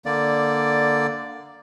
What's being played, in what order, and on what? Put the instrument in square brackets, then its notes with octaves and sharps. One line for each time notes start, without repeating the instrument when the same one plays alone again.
[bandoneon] D3 A#3 D5